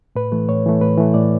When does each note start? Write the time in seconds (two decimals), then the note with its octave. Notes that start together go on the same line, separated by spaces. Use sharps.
0.16 A2 B4
0.32 E3 A3
0.49 A2 C#5
0.66 E3 A3
0.81 A2 B4
0.98 E3 A3
1.14 A2 D5